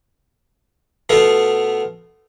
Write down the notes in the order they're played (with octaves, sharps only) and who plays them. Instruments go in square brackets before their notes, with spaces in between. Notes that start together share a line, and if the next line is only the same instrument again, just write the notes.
[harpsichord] B2 A3 B3 F4